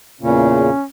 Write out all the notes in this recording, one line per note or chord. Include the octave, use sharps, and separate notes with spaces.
E2 A#2 C#3 C#4